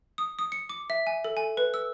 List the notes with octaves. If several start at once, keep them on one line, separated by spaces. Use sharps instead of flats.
D#6
D#6
C#7
D6
E5
G#5
A4
G#5
B4
E6